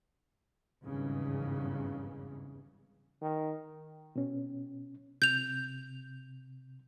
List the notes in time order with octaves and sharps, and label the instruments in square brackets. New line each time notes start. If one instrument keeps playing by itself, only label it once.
[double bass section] G#1 E2 G2 C#3 E3
[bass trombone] D#3
[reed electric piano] B2 C#4
[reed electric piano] C3 [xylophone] G6 F7